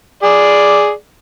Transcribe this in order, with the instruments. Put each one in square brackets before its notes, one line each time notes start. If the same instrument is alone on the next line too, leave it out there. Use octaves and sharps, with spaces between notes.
[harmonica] G#4 D5